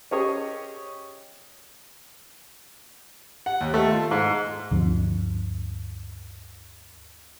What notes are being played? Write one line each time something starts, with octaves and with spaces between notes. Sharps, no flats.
C#4 G4 G#4 C#5 D#5
F#5
D#2
A3
F4
G#2
D2 G2 F3 C4